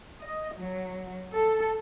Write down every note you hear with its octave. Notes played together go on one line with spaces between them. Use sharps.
D#5
F#3
A4